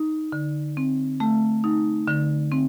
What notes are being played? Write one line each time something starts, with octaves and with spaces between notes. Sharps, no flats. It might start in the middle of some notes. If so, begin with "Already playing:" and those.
Already playing: D#4
D3
C4
A3
D#4
D3
C4